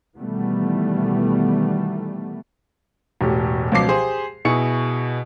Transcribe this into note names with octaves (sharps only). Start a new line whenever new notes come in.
B2 D#3 E3 G3 A3 B3
E1 A2 G4
C#2 B2 F3 F#3 D6 C7
G4 G#4 C5
B2 E4 G#4 C#6 C#7